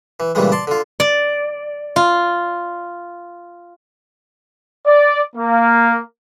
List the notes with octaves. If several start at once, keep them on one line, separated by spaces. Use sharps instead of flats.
E3
A#2 C#3 E3 G3 G#3
D5 A5 C6
D3 F4
D5
F4
D5
A#3